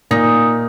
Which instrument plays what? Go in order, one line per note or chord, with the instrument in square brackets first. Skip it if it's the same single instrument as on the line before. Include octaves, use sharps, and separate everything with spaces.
[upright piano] A#2 [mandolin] D#4